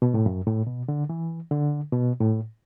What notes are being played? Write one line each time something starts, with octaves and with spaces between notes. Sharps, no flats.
B2
A2
F#2
A2
B2
D3
E3
D3
B2
A2